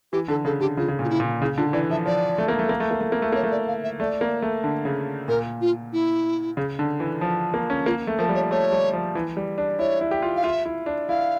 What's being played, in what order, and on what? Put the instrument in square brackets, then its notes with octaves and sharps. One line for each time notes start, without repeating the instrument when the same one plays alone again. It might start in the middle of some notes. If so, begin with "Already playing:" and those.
[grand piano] E3 [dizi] G4
[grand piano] D3 [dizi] A4
[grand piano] C#3 [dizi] A4
[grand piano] D3 [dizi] G4
[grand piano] C#3 [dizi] F4
[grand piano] C#3
A#2
[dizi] F4
E4
[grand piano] A#2
[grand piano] C#3 [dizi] E4
[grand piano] D3 [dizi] F4
[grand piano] E3 [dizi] D5
[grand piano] F3 [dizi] E5
[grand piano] F3 [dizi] D5
[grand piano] A3
A#3
A3
A#3
A3
A#3
A3
A#3
A3
[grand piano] A#3 [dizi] C#5
[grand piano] A3
[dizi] D5
F5
E5
[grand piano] A3 [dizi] D5
[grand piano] A#3
A3
D3
C#3
[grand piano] A#2 [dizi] A#4
[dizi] F4
E4
[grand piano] C#3
D3
E3
F3
A#3
C#4
[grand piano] A#3 [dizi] F4
[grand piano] A3
[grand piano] F3 [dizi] A#4
[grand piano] G3
[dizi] C#5
[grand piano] A3 [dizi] C#5
[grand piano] G3
F3
E3
G3
D4
[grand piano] E4 [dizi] C#5
[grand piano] E4
G4
F4
[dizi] F5
[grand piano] F4 [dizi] E5
[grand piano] E4
D4
[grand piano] E4 [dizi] F5